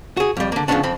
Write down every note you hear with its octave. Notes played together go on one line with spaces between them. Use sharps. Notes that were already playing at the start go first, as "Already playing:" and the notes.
F#4 G#4
F2 G3
D3 A#3
C#3 F3 G#3 B3 C#4 D4
F2 C4 B5